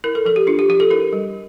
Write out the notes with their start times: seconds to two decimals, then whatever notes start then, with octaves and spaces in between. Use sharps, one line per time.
0.04 E4 A#4
0.15 A4
0.25 F3 A4
0.36 G4
0.47 D4 F4
0.59 G4
0.69 F3 G4
0.80 A4
0.90 E4 A#4
1.13 G3